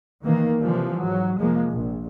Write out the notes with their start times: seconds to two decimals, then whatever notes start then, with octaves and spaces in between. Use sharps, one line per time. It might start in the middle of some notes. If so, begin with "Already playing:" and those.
0.24 D#3 E3 A#3
0.61 C3 E3 F3 G3
0.97 G#2 F#3
1.38 F1 F3 G#3 A#3
1.70 A#1